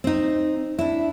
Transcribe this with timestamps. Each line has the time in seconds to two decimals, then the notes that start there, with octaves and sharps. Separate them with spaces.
0.04 C4 D#4
0.79 D4 E4